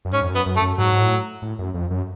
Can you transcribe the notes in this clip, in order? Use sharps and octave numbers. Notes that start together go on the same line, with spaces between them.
F#2
G#2 C#4
F2
F#2
B3
F#2
A3
F#2
G#2 F#3
G#2
A2
A2
F#2
F2
F#2